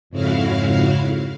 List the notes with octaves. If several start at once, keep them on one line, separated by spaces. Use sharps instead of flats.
F2 G#2 C#3 E4 F#4 F5